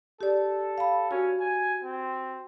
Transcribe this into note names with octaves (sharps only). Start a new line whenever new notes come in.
G4 A4 D5
F5 B5
C#4 F#4
G#5
C4